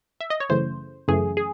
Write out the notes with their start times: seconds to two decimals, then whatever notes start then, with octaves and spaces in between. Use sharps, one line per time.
0.20 E5
0.30 D#5
0.40 C#5
0.50 F#2 C#3 E3 A3 C5
1.08 F#2 C#3 E3 A3 G#4
1.37 G#4